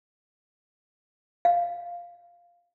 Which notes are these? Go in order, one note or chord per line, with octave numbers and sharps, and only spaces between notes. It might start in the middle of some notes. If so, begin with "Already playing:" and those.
F5